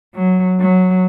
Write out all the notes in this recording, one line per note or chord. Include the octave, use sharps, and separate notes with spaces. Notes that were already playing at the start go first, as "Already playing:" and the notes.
F#3
F#3